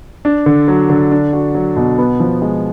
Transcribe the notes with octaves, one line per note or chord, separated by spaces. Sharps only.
D4
D3
F#3
D3
D4
F#4
F#3
B2
B3
F3
G#3